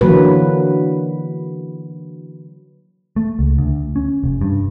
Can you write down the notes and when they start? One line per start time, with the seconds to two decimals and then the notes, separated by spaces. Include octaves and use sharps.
0.01 D3 E3 F#3 A#3 B4
3.16 A3
3.39 C#2
3.59 D2
3.96 C#4
4.24 F1
4.41 G2